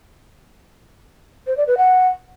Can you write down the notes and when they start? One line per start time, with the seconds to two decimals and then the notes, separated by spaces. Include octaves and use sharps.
1.47 C5
1.57 D5
1.67 B4
1.77 F#5